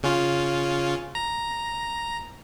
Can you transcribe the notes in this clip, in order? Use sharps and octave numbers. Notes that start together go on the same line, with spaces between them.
C#3 C#4 F4
A#5